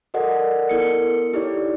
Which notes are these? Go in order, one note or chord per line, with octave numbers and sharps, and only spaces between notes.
F#4 A4 A#4 D5 D#5 F#5
B3 E4 A4 A#4 C#7
D#4 E4 G4 C#5 D5